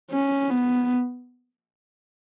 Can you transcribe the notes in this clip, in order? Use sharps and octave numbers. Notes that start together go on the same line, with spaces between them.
C#4
B3